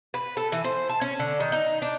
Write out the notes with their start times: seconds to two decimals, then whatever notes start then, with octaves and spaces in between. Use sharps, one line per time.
0.14 B4
0.37 A4
0.52 E3
0.64 C5
0.89 A5
1.01 C#4
1.19 D3
1.40 D#3
1.52 D#4
1.82 D4